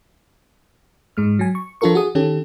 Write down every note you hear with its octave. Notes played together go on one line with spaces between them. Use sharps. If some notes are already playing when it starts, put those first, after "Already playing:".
G#2 G#3 F6
F#3 G#5
C#6
F3 D4 F4 A4 A#4 C#6
F#4 G#4 D#6
D#3 C#4 G4 A4